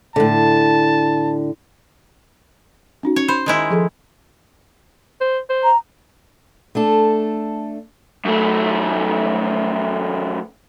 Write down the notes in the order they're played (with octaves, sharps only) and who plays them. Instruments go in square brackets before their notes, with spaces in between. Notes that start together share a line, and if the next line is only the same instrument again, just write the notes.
[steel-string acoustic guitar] A2 D3 [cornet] A5
[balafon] C#4 D#4 F#4
[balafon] C#4 [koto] C#5
[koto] C5 [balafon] B5
[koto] D#3 G#3 E4
[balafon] F3 G#4 A4
[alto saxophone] C5
C5
[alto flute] A#5
[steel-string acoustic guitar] A3 D4 A4
[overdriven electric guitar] F#2 A3